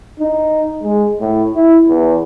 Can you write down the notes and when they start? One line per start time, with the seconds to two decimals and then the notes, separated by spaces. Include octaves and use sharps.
0.20 D#4
0.83 G#3
1.20 A2
1.55 E4
1.88 E2